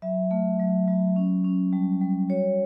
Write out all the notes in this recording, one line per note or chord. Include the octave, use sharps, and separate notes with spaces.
F#3 E5
A3
F#3
F#3
C#4
C#4
G3
G3
F#4 C#5